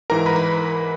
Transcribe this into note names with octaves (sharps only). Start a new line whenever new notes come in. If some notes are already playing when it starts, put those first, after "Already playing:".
G#2 E3 A#4 A#5
B4 B5
B5